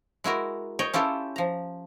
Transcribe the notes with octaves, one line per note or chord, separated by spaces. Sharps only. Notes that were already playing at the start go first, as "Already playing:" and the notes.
G#3 E4 F#4 A#4
C#5 D#5 G5
C#4 E4 F4 G4 A4
F3 A#5